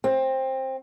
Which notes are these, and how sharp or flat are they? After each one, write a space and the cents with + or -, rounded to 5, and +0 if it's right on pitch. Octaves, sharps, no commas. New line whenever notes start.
C4 +15